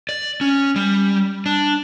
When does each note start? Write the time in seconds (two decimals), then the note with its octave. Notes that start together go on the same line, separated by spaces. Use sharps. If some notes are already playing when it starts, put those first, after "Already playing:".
0.09 D5
0.41 C#4
0.76 G3
1.46 D4